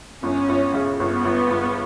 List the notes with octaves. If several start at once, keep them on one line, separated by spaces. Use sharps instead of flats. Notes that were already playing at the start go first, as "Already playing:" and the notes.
G1 C#4
G1
C#3
G1 B3
G1
G1